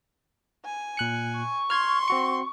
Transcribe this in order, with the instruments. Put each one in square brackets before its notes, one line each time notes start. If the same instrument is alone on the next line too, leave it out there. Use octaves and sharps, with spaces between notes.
[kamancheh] G#5
[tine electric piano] A#2 F#6 C#7
[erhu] C#6
[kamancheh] C6 [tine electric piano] F6 G#6
[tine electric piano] C4 F#4 C#7